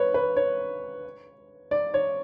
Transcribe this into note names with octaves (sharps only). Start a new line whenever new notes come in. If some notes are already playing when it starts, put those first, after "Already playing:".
Already playing: B4 C#5
B4
C#5
D5
C#5